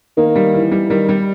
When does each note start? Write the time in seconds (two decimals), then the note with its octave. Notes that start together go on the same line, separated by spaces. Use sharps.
0.17 D#3 A#3
0.36 G3
0.53 E3
0.71 G3
0.90 D#3 G3
1.09 G3